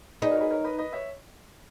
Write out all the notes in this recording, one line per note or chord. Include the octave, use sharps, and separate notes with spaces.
D#4 G#4 B4
F#4 A#4 C#5
G#4 B4
A#4 C#5
B4 D#5
B4 D#5
C#5 E5